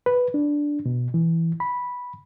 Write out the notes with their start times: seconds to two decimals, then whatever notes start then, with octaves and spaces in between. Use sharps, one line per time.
0.06 B4
0.34 D4
0.86 B2
1.14 E3
1.60 B5